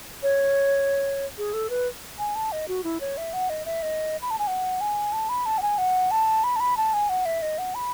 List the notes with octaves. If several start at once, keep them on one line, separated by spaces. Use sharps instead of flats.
C#5
G#4
A4
B4
G#5
A5
D#5
F#4
E4
C#5
E5
F#5
D#5
E5
D#5
B5
A5
G#5
F#5
G#5
A5
B5
A5
F#5
G#5
F#5
A5
B5
A5
B5
A5
G#5
F#5
E5
D#5
F#5
B5